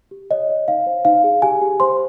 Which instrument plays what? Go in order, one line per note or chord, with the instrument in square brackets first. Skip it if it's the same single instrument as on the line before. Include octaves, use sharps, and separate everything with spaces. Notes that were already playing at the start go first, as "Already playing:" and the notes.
[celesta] G4
C#5 D#5
C#5
D#4 F5
C5
D#4 F5
G#4
G4 G#5
G4
C5 C6